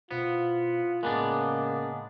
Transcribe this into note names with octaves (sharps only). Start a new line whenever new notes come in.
B2 B3 E4 F4 C5
A2 C#3 G#3 A#3 B3 D4 F#6